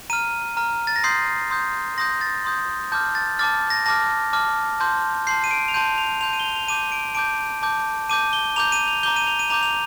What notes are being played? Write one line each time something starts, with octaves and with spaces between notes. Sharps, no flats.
A#5 F6 D#7
A#5 F6
A6
A#6
C6 D#6 G6 C7
C6 D#6 G6
C6 D#6 G6 A#6
A6
C6 D#6 G6
A5 D6 F6 G6
A6
A5 D6 F6 A6
A#6
A5 D6 F6 A#6
A5 D6 F6
A5 C6 G6
A5 C6 G6 C7
D#7
D7
F7
A5 C6 G6 D#7
F7
A5 C6 G6 F7
D#7
G7
F7
F7
A5 D6 G6 D#7
D7
A5 D6 G6 D7
A5 D6 G6
A5 D6 G6 D#7
G7
A#5 D6 G6 F7
D#7
F7
A#5 D6 G6 G7
D#7
F7
D#7
A#5 D6 G6 F7
F7